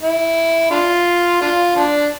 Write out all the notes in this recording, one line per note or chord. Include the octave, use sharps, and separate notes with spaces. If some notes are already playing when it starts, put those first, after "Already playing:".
E4
D4 F4
D4 F4
F3 D4